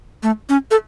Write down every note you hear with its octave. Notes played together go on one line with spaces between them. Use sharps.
A3
C#4
A4